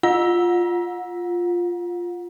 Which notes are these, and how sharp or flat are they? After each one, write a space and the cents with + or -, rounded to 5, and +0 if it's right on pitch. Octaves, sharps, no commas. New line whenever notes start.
F4 +0 F#5 -30